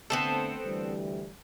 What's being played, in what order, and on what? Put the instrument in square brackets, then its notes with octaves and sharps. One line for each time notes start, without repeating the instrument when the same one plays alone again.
[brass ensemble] D3 A3 [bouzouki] B3 C4 A4
[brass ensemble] D2 E3 G3